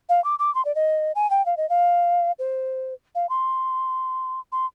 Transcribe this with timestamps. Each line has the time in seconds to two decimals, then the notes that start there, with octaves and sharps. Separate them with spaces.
0.09 F5
0.24 D6
0.39 D6
0.55 C6
0.65 D5
0.75 D#5
1.15 G#5
1.30 G5
1.46 F5
1.57 D#5
1.70 F5
2.39 C5
3.15 F5
3.29 C6
4.52 C6